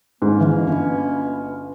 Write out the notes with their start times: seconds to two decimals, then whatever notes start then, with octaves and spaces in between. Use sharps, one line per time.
0.22 G#2 B2 A#3 C#4
0.40 E3
0.67 G1